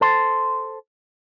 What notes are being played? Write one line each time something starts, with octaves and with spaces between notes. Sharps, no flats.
A4 C5